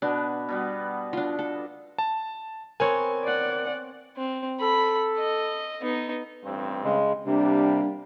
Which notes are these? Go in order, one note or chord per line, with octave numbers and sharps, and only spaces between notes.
B2 B3 D4 B4
B2 G3 B3
D4 F4
A4
A5
B3 C4 A#4 C#5 G#5
D5 F#5
C4
A4 B5
D#5
B3 D#4
A1 G2 C4
C#3 G#3
C3 G3 A#3 D4